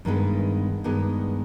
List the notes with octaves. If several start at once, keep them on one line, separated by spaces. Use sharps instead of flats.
G2 D#3 G#3 B3
G2 D#3 G#3 B3